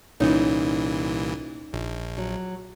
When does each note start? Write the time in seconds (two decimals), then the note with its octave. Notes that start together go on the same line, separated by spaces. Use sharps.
0.20 C2 A#2 E3 C#4 D#4
1.73 A#1
2.18 F#3